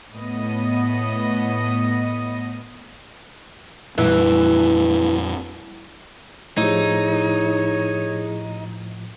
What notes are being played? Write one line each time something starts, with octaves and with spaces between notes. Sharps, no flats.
A2 B3 D#5
F2 A#2 E3 G3
A2 F3 D#4 E4 G4 G#4 C#5